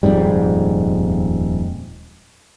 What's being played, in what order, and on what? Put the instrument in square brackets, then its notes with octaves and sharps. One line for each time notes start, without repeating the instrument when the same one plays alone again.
[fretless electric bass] D#1 F2 G#2 G3